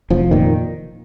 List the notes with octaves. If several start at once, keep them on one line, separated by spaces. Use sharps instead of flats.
F1 F3
A#2 D#3